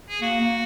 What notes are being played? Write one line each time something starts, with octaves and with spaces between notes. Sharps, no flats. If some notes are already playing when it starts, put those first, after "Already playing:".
G#4
A#3 F#4
A#3